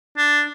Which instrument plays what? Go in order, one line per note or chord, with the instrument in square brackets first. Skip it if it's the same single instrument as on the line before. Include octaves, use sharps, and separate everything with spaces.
[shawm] D4